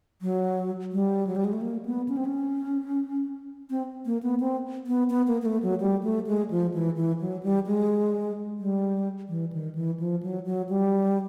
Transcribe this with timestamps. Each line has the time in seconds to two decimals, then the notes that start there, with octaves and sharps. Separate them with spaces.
0.22 F#3
0.92 G3
1.27 F#3
1.36 G3
1.45 G#3
1.53 A3
1.61 A#3
1.85 B3
2.09 C#4
2.17 C4
2.25 C#4
3.70 C4
4.06 A#3
4.23 B3
4.40 C4
4.87 B3
5.10 B3
5.27 A#3
5.42 A#3
5.46 A3
5.63 F#3
5.80 G3
6.03 A3
6.27 G#3
6.50 F3
6.74 E3
6.96 E3
7.20 F#3
7.43 G3
7.67 G#3
8.59 G3
9.29 E3
9.53 D#3
9.75 E3
10.00 F3
10.23 F#3
10.46 F#3
10.69 G3